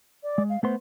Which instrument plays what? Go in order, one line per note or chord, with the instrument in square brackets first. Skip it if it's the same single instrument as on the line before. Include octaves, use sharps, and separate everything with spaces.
[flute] D5
[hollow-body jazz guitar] G#3
[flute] F5
[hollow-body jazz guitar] A3 B3 C6 [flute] C5